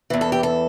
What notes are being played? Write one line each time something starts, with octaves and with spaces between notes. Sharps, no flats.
E2 E3
A4
G4
A4